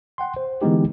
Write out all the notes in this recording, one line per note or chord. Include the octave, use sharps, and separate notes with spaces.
F#5 G5 C6
C5
D3 E3 G#3 B3 D#4 G4